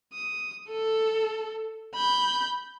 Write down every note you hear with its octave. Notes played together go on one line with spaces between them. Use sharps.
D#6
A4
B5 G6